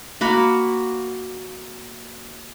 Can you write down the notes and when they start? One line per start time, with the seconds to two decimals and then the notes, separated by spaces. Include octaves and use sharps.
0.21 A#3 F#4 B5